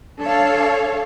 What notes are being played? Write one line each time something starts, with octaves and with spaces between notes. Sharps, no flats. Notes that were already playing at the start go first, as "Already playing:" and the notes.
D4 A4 C#5 F5